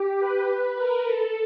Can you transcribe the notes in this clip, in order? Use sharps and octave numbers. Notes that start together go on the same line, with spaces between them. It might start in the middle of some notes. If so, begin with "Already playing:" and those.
Already playing: G4
B4
A#4
A4